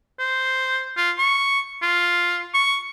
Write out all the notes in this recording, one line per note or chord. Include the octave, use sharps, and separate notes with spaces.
C5
F4
C#6
F4
C#6